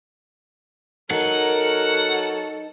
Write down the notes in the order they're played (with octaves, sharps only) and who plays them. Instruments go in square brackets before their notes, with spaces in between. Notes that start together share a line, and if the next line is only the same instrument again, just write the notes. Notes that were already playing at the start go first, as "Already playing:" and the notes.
[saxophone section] F#3 A4 [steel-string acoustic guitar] D#4 [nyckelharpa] A#4 [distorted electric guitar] F#5